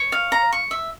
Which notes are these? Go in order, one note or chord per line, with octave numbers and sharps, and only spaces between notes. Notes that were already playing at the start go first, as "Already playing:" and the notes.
Already playing: C#5
F5
A#5
C#6
E5